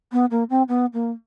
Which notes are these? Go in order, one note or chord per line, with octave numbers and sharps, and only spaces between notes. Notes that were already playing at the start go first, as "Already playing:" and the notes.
B3
A#3
C4
B3
A#3